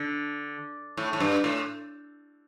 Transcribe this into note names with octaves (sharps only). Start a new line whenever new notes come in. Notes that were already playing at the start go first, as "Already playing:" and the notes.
Already playing: D3
A2
A2
G2
A2